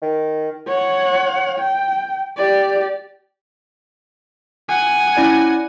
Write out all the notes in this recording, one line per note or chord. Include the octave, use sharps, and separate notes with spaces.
D#3
C#5 F#5
G5
G4 D5
F#5 G#5
C#4 E4 D5